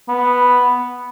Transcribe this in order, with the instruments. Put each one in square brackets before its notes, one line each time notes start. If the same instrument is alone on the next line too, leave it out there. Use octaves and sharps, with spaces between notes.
[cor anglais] B3